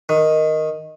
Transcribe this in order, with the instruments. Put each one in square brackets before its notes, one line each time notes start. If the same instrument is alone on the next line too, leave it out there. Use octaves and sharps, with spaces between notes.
[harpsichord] D#3